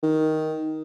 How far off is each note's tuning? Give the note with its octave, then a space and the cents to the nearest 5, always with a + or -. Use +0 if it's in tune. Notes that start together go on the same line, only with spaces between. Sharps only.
D#3 +5